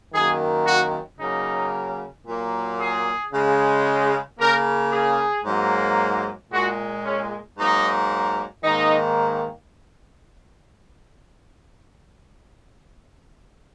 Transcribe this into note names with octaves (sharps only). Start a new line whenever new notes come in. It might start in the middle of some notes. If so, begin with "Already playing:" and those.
F#2 D#3 A#3 G#4
F#4
C#3 F#3 A#3 D#4
A#2 F#3 A#3
G#4
C#3 G#3
C#3 A#3 A#4
G#4
G#2 F#3 A#3
A#2 G#3 F#4
C#4
G#2 F#3 A#3 D#4
G#2 D#3 A#3 D#4